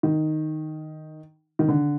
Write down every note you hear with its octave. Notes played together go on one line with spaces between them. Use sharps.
D#3
D#3
D3